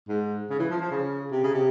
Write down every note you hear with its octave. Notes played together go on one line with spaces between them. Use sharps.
G#2
C#3
E3
F3
F3
C#3
C3
C#3
C3